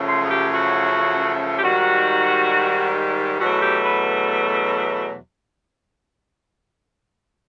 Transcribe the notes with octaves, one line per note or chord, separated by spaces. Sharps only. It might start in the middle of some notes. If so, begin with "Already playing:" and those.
Already playing: F#2 C#3 F3 A3
C5
G#4
G4
F#4
G4
G#2 D#3 G3 F#4
E2 B2 F#3 A3 F#4
G4
B4